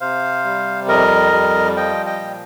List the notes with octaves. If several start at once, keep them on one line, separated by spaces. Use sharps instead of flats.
C3 C5 F5
G3
F2 A#4 D#5
G3
F3 D#5 G5
D#5 G5
A#2